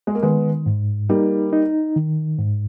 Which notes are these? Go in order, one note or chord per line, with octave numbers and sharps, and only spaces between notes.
G#3
A#3
D#3 G#3 B3
G#2
G3 A#3 D#4
D#4
D#3
G#2